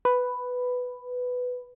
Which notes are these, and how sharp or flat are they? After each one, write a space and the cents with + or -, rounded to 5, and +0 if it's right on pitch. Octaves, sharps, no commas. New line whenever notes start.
B4 +5